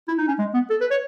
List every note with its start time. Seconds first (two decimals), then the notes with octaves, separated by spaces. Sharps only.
0.08 E4
0.18 D#4
0.28 C#4
0.39 G#3
0.54 B3
0.70 A4
0.81 B4
0.91 C#5